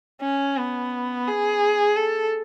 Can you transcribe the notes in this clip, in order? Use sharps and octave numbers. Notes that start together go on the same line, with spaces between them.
C#4
B3
G#4
A4